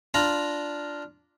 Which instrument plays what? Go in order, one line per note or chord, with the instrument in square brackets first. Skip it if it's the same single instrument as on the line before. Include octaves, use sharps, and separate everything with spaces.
[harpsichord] D4 F4 A#5 B5